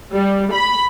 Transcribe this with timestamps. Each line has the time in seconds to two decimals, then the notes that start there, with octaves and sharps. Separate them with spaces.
0.14 G3
0.54 B5